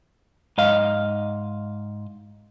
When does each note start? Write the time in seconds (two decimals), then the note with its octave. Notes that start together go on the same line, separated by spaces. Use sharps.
0.58 G#2 D#5 F5